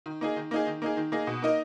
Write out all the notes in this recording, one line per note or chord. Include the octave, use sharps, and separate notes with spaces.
D#3
A#3 D#4 G#4
D#3
A#3 D#4 G#4
D#3
A#3 D#4 G#4
D#3
A#3 D#4 G#4
B2
A#3 D#4 A#4 D#5